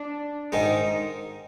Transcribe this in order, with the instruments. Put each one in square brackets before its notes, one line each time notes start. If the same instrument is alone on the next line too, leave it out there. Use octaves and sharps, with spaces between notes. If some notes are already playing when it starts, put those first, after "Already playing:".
Already playing: [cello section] D4
[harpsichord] G#2 D#3 G#3 [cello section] D#4